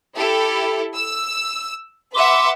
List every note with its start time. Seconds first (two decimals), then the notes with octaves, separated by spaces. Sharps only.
0.15 E4 G4 A4
0.95 E6
2.14 B4 E5 F#5 C6 D6